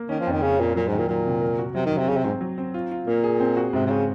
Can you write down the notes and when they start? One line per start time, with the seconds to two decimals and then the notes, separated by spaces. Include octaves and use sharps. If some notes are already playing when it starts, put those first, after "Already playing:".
Already playing: A#3
0.09 D#3 C#4
0.20 F3
0.27 F2 D#3
0.42 C#3 C#4
0.59 F2 A#2
0.76 A#2 F#3
0.87 G#2
0.92 D#3
0.98 A#2
1.09 A#2 F#3
1.26 C3
1.42 A#4
1.59 F#4
1.75 C3 F#3
1.86 D#3
1.92 F#3
1.98 C3
2.08 C#3 C4
2.17 C3
2.24 G#2 C4
2.41 F#3
2.58 C4
2.74 F4
2.92 F4
3.07 A#2 A#3
3.24 G#4
3.40 C4
3.57 F#4
3.73 G#2 C3
3.86 C3
3.90 C#3 C4